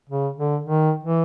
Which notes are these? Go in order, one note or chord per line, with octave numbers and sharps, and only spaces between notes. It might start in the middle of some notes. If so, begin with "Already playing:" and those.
C#3
D3
D#3
E3